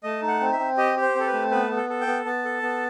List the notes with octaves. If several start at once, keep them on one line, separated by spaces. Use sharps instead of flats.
A3 D#5
D#4
F#5
C4
E5
C4
G4 D#5
G4
C5
C4 A4
B4
A3
B3 B4
B3
A4
A4
G5
B3
B3 A5
A4
B3